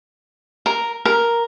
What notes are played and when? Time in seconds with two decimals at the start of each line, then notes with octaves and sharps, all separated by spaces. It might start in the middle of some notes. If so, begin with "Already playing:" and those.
0.66 A#4
1.05 A#4